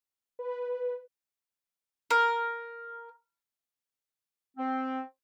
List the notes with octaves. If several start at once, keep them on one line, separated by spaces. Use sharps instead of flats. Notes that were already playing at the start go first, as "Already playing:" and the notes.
B4
A#4
C4